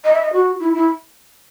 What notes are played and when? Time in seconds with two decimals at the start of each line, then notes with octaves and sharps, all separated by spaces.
0.04 D#5
0.13 E5
0.22 D#5
0.33 F#4
0.60 E4
0.74 E4